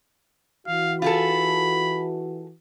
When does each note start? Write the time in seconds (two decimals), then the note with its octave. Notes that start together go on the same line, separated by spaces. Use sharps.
0.67 E3 F#4 F5
1.02 F4 G#4 A4 B5